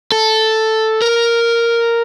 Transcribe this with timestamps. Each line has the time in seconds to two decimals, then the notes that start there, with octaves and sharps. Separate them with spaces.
0.12 A4
1.02 A#4